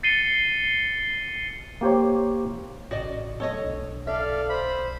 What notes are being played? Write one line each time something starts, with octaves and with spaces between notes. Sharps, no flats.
A6 C7 C#7 D#7 G7
A#3 G4 C5 C#5
A1 C#3 F#4 D5 D#5
F#3 A3 B3 A4 C#5 D#5
B1 D4
A4 D5 E5 F5
C5 B5